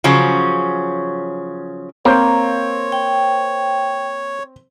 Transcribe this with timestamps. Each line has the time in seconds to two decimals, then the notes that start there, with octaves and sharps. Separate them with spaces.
0.04 C#3 F3 F#3 C#4
2.05 A#3 C4 C5 C#5
2.92 G5